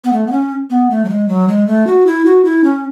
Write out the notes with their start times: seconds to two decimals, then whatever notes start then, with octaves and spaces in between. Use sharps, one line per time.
0.04 B3
0.13 A3
0.27 B3
0.32 C#4
0.70 B3
0.90 A3
1.05 F#3
1.09 G#3
1.28 F#3
1.48 G#3
1.67 A3
1.87 F#4
2.06 E4
2.25 F#4
2.45 E4
2.64 C#4